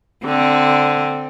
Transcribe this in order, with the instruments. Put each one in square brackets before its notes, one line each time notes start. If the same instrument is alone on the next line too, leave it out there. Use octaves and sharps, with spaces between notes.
[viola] D3 [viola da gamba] C4